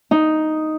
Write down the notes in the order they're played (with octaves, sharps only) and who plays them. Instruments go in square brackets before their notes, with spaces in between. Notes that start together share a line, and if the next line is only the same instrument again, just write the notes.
[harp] D#4